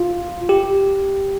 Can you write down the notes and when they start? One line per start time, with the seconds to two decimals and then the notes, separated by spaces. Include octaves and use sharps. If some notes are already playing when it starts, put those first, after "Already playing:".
Already playing: F4
0.49 G4